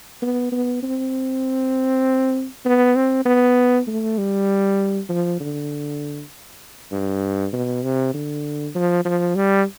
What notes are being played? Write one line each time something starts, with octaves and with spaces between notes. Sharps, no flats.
B3
B3
C4
B3
C4
B3
A3
G3
F3
D3
G2
B2
C3
D3
F3
F3
G3